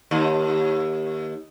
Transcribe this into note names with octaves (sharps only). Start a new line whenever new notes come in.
D#2